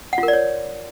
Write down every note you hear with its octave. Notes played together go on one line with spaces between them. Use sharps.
F#5
F4
A#4
D5
C#5